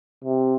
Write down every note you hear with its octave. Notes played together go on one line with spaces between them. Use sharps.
C3